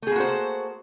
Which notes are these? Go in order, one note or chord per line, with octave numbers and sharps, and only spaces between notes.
A3 A#3 F#4 G#4 C5